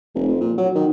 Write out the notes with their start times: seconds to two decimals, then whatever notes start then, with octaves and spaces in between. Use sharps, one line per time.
0.15 F1
0.28 F2
0.40 A#2
0.58 F#3
0.75 D#3